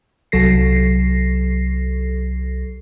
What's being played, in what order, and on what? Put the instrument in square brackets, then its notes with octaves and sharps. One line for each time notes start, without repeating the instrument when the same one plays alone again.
[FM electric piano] C2 F#3 A4 A#6 C7